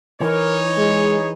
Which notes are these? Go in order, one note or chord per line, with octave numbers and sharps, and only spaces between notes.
E3 D#4 A#4 C#5
G#3 G#4